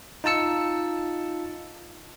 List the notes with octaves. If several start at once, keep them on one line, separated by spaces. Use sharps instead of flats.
D#4 F4 A5 E6 C#7